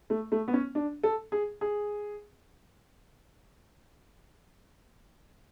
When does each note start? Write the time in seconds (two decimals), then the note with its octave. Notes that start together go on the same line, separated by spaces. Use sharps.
0.10 A3
0.32 A3
0.48 B3
0.53 C#4
0.75 D4
1.03 A4
1.32 G#4
1.61 G#4